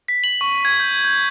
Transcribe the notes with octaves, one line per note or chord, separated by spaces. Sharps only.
B6
F#7
C#6
G#6
G6
G6